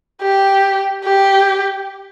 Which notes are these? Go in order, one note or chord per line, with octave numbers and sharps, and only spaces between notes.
G4
G4